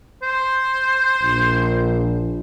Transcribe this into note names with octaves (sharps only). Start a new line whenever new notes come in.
C5
A#1